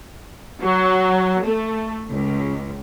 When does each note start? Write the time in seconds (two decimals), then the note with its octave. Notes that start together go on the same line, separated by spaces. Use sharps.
0.61 F#3
1.44 A3
2.09 C#2